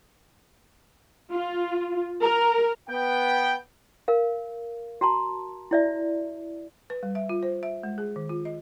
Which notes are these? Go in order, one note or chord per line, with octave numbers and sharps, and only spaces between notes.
F4
A#4
B3 G5
A#4 F5
F#4 A5 A#5 C6
E4 D5 E5
B4
G3
E5
F4
C5
E5
G#3
G#4
D#3
F4
D#5